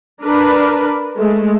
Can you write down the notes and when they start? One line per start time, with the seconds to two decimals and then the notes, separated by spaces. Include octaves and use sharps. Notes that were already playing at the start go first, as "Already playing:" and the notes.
0.22 D4 A#4 B4
1.16 G#3 A3